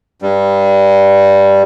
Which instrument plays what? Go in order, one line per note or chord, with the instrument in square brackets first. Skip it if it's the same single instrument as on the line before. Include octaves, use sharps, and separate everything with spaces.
[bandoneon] G2 G3